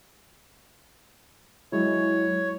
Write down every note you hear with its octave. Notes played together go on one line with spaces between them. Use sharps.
F#3 G#3 E4 C#5